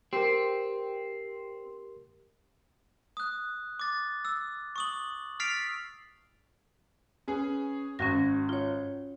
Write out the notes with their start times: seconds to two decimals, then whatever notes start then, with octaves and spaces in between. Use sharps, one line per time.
0.13 C4 G4 A#4
3.17 D#6 F#6
3.79 D6 A6
4.25 E6
4.76 C#6 D#6 F#7
5.40 F6 A6 B6 C7 D7 F7
7.28 C#4 G#4 B4
7.99 G#1 C#4 F#4 A#6
8.49 F4 C#5